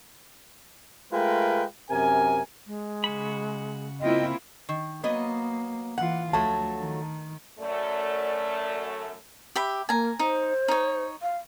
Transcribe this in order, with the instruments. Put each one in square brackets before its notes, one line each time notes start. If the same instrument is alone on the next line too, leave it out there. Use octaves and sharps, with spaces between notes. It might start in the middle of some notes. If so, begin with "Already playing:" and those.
[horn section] G#3 A3 F4 A#4 B4 G5
F#2 C3 A#4 G#5
[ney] G#3
[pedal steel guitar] C#3 F#4 B5
[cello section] A#3 E4 F4 [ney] C4 [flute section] D#5 G5
[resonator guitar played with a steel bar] D#3
[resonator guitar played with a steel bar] F#3 B3 D#5 [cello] A#3
[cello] E3 F4 [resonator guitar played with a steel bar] F#5
[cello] D2 [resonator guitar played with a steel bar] F3 F#3 A3 [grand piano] A5
[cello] D#3
[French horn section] F#2 A3 [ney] D5
[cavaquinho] G4 E5 B5
[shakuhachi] A#3 [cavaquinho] G#5 A#5
[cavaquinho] D#4 [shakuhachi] C5
[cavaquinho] D#4 C#5
[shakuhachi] F5